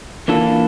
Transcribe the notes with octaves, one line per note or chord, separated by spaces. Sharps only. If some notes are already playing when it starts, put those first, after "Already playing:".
E3 A#3 D4 F4 A4